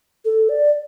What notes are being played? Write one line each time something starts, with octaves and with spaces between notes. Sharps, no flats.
A4
D5